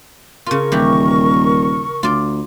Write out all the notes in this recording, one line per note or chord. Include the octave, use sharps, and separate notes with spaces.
C#3 F4 A#4 C#6
D#1 E3 G4
D2 F4 D5